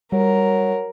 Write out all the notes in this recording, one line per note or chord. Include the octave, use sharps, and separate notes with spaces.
F#3 G3 A#4